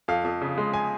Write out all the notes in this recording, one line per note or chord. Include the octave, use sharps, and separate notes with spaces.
F2 F5
F2
C#3
G#3
G#5